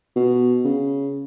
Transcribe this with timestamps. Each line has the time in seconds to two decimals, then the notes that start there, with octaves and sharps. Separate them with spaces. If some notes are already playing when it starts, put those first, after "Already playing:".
0.16 B2
0.65 C#3